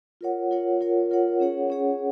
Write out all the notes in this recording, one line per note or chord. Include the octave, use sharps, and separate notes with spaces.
F4 A#4 C#5 F#5
F4 A#4 C#5 F#5
F4 A#4 C#5 F#5
F4 A#4 C#5 F#5
C#4 G#4 C#5 F#5
C#4 G#4 C#5 F#5